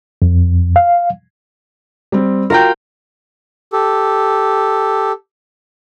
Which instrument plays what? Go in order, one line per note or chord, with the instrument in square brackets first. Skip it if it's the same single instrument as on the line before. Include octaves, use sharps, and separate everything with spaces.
[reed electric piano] F2
F5
[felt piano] G3 C4
[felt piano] F4 F#4 G5 [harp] A#4 A#5 G6
[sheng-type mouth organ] G4 A4